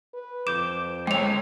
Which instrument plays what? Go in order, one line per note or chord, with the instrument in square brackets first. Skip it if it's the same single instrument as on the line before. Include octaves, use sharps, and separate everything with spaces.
[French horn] B4
[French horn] F2 [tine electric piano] D6 G6 [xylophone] E7
[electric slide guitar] G#3 C#5 [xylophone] G5 F7